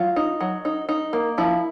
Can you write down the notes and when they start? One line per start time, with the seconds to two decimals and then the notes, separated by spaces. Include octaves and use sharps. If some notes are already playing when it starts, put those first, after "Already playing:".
Already playing: F#3 F4
0.16 D#4
0.40 F#3
0.65 D#4
0.89 D#4
1.13 A#3
1.38 F3 E4